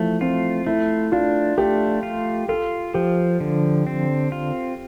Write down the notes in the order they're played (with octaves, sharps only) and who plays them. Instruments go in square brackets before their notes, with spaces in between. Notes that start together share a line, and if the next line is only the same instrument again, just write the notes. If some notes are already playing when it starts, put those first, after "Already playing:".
Already playing: [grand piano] E3 F3 [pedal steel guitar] A3
[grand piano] C4 [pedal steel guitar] F4
[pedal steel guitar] A3 [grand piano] E4
[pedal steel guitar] D4 [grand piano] F4
[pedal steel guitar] A3 [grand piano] G4
[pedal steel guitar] F4
[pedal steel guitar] F4 [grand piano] A4
[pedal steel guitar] F3 [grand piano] G4
[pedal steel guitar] D3
C4
F4